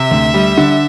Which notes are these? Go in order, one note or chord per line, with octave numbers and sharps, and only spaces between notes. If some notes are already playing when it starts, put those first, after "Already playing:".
Already playing: C3 E5
D2
G3
D3